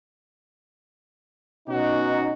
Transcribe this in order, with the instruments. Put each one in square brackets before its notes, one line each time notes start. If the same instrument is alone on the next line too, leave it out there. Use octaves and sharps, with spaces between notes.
[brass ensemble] B2 C#4 D#4 F#4